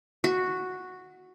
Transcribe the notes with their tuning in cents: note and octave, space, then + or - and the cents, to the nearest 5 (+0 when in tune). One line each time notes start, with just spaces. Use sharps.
F#4 -5